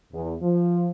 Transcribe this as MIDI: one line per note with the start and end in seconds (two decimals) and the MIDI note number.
0.12 0.35 40
0.42 0.88 53